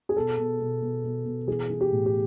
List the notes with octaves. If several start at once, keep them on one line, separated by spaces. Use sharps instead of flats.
G#4
B2 A4
B2
B2
B2
B2
B2
E3 G#4
E3
G4
A2
G4